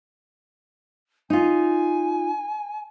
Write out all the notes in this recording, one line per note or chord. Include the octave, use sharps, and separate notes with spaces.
D#4 F4 G#5